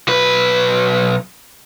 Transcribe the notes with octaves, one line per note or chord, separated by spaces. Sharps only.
B1 B4